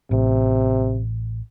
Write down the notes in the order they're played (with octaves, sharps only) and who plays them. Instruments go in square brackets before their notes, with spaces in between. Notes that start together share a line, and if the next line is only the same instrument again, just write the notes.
[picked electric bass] A1 [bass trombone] C3